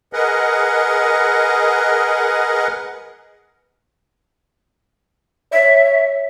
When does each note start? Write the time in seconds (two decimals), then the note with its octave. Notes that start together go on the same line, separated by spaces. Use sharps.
0.13 G#4 A#4 B4 D#5 F#5
5.52 C#5 E5